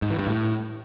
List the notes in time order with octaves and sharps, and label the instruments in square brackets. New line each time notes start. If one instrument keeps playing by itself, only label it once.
[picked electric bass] G#2
E3
G2
A2